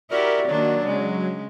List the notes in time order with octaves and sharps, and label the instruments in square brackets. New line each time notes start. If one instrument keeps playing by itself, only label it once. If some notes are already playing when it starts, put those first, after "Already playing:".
[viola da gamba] E4 F#4 G4 [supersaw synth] A#4 [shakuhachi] D5
[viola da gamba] D#3 A#3 D4 [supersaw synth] F#3
[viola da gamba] C#3 G#3